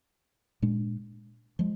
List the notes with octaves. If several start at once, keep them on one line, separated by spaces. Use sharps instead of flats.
A#2 G#3 D4
F3 G#3